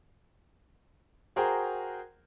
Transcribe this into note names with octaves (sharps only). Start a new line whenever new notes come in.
F#4 G#4 A#4 C5 G5 A#5